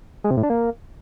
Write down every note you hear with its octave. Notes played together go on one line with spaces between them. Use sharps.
G#3
C3
A2
D4
A#3